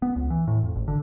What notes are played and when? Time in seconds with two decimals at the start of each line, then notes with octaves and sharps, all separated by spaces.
0.02 B3
0.16 C#2
0.30 E3
0.48 A2
0.64 F2
0.76 G#1
0.88 D3